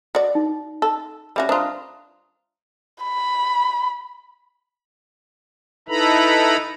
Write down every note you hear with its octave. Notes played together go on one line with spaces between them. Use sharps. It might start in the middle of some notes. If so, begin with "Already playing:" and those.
F#4 D5
D#4
A4
G3 C#4 F#4 E5 B5
D4 F4 C5 A#5 D#6
B5
D#4 E4 A4 B4 A#5 B5